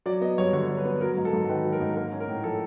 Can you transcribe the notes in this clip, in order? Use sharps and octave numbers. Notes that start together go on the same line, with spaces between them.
F#3 D5
B3 D#5
G2 C#5
D3 C#5
F#3
B4
B3
F#3 A#4
G#2
A4
G#2
D#3 B4
F#3
A#4
G#2
A#3 A#4
C#4
A#4
A2
F3 A4